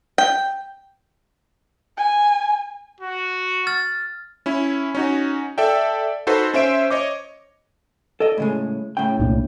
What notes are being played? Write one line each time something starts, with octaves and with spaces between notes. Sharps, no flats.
G5
G#5
F#4
F6 A6
C#4 E4
C#4 D#4 F#4
A4 D5 E5 G5
D#4 F#4 A4 B4 C5
C#4 C5 E5 D7
C#5 D#5 D6
A4 D5 D#5
A2 C#3 G#3
A2 C#3 G5
C2 A#2 D4